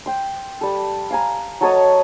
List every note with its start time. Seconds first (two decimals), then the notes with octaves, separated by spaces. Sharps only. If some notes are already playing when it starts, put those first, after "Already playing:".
0.06 G5 C6
0.61 G3 A4
1.10 F5 G#5 A#5
1.61 F#3 A4 C#5 D#5